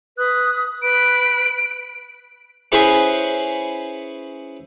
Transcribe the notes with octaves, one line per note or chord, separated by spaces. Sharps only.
B4 D#6 F#6
B4 B5 F#6 D7
C#4 E4 G#4 B4 C5